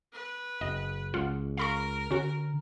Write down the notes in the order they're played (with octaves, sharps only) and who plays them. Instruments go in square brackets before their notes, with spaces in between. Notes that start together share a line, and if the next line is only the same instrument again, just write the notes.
[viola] B4
[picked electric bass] F#1 [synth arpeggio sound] D#5
[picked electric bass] C#2 [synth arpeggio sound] F4 F#5
[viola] A#4 [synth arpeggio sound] F5 B5 C#6
[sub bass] D3 [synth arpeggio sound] C#4 F#4